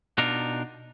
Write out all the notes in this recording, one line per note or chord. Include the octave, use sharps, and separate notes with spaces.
B2 D4 D#4 F4 A#4